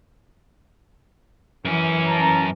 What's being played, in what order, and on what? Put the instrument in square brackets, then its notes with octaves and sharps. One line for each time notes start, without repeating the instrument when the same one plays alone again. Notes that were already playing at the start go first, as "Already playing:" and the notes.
[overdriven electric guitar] F#2 C#4 [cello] E3
[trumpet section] A5 A#5